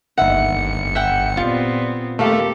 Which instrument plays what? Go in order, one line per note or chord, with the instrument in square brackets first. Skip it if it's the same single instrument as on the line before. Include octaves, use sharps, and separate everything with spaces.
[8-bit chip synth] G1 C#7 [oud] D#2 D#4 E5 [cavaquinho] F#5
[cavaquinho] E5 F#5 G5
[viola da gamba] A#2 B3 C4 [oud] G3 [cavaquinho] F4
[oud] D#2 A#4 F5 [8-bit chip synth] A3 [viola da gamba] C4 G4 A4